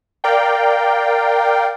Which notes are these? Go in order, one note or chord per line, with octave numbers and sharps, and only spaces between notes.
A#4 D5 F5 G5